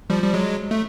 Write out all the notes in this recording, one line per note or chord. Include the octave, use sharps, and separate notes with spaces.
F3 G3
G3
F#3 G#3
A3